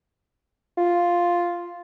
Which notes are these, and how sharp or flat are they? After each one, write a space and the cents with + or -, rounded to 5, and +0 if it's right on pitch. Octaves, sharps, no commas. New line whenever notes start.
F4 +0